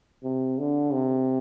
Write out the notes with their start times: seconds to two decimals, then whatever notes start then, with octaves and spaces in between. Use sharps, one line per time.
0.23 C3
0.58 D3
0.93 C3